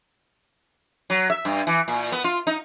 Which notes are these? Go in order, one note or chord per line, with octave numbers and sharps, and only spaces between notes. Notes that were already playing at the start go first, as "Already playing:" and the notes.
F#3
E5
G2
E3
A#2
B3
F4
D#4